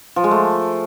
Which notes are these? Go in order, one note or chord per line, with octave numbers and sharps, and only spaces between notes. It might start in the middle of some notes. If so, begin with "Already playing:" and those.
F3
G#3
A3